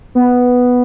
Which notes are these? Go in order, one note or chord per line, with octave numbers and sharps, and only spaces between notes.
B3